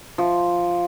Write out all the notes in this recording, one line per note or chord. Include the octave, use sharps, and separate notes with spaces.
F3